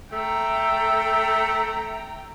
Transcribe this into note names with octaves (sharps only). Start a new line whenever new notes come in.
A3 G5 A#5